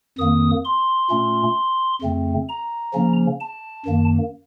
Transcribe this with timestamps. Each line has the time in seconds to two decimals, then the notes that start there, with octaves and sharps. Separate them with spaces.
0.18 F2 D#3 A#3 D#6
0.65 C6
1.10 A#2 A3 C#4
2.02 F2 C#3 A3 C4
2.49 A#5
2.94 C#3 F3 A#3 C#4
3.41 A5
3.86 F#2 D#3 A#3